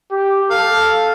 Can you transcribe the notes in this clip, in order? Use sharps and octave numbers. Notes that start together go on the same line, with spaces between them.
G4
A4 F5